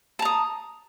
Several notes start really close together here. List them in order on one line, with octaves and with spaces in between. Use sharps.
A5 A#5 D#6